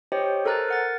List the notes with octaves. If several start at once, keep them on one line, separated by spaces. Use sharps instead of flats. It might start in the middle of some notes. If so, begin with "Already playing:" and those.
G4 C5 C#5 D#5 G5
A4 A#4 C5 A#5 F#6 A6
A#4 F#5 A6